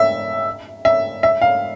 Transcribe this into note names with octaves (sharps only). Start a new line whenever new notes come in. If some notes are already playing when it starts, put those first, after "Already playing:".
Already playing: E5
E5
E5
F5